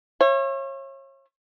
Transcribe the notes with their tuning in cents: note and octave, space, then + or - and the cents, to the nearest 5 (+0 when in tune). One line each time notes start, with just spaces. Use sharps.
C#5 -35 E5 +40